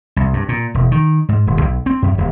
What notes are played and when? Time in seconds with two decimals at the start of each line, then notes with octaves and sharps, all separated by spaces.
0.16 C2
0.33 G2
0.49 A#2
0.74 E1
0.91 D#3
1.29 G#2
1.47 D#1
1.61 B1
1.86 C4
2.02 F#2
2.18 D#1